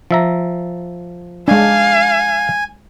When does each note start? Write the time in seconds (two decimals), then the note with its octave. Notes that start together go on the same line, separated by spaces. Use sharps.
0.11 F3 E5 A#5
1.48 G#3 D4 F5 G#5